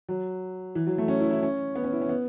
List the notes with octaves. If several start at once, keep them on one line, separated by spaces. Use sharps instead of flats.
F#3
E3
F#3
A3
C#4
E4
E4
C#4
B3
C#4
E4
C#4
B3